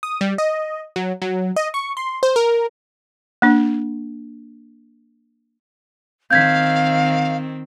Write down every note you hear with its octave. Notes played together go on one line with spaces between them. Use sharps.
D#6
G3
D#5
F#3
F#3
D#5
C#6
C6
C5
A#4
A#3 D4
D#3 C4 F5 G6 G#6 B6